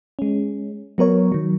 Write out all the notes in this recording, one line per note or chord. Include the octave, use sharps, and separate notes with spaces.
G#3 C#4
F#3 B3 A#4 C#5
D#3 F#3